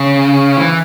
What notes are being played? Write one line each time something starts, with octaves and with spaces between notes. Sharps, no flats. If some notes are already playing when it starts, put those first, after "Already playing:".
Already playing: C#3
E3